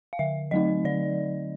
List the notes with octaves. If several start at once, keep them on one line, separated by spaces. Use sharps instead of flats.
F5
D3 E5
F#3 A3 C4 D#4 D#5
D3 D5